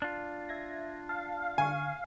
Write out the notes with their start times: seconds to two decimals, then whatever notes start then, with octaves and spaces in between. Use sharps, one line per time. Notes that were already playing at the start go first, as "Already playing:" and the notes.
0.02 D4 F4
0.49 E5 G#6 A#6
1.09 F5 A5
1.58 D3 G#5 C#6